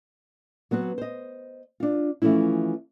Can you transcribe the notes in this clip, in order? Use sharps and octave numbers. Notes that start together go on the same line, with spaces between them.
F#3 B3 C4 B4
C5 D#5
D4 F4
E3 F3 A3 C#4 E4